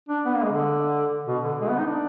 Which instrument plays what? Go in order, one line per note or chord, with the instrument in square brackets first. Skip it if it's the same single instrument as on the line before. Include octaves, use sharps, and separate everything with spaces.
[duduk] D4
B3
A#3
G#3
D3
B2
D3
G#3
B3
D#4
D4